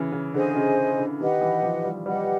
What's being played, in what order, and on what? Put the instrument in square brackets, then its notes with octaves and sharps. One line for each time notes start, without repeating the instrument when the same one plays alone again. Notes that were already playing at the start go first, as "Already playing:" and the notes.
Already playing: [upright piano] C#3 E3
C#3
[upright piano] D3 [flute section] G#4 C5 D#5 G#5
[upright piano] C#3
D3
[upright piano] D#3 [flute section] G4 B4 D#5 F#5
[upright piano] E3
F3
G3
[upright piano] G3 [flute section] G4 B4 D#5 F#5